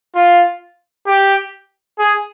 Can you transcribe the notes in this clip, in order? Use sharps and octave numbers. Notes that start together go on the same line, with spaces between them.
F4
G4
G#4